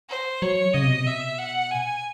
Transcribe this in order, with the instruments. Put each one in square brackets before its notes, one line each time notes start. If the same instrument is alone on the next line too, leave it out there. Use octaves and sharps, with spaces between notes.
[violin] C5
[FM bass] F#3 [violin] C#5
[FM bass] C#3 [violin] D#5
[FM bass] C3
B2
C3
[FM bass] B2 [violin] E5
[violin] F#5
G#5